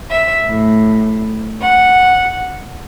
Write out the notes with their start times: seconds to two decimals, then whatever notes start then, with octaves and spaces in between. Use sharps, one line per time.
0.10 E5
0.44 A2
1.60 F#5